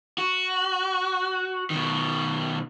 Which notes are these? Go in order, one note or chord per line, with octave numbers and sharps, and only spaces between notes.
F#4
B2 D#3